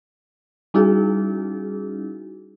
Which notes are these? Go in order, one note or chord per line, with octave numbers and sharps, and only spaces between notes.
G3 C#4 D#4 E4 F#4 G#4